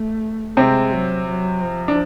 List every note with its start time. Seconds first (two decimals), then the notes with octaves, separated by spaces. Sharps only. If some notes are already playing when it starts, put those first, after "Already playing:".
Already playing: A3
0.57 C3 G#3 C4
0.92 F#3
1.27 F#3
1.62 F3
1.88 D4